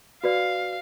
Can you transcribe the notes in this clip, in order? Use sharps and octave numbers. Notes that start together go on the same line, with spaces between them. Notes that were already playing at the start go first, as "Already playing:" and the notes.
F#4 B4 D5 F5